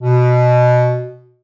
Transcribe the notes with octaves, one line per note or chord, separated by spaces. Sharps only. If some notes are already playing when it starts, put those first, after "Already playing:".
B2